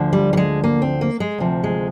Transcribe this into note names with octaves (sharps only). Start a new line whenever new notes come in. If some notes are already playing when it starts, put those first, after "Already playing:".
Already playing: D2 D3 F3
G3
G3
G#3
A#3
C4
A#3
G#3
D2 C3 F3
G#3